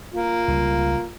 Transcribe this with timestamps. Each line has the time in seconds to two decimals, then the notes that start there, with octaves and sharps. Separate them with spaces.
0.14 A#3 F4
0.48 C#2 G3